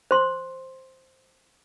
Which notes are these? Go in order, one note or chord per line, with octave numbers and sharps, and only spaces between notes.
C5 C6